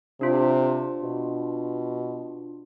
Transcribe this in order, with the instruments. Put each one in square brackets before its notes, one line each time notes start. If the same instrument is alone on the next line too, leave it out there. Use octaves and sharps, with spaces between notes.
[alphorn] C3 [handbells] D4 F4
[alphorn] B2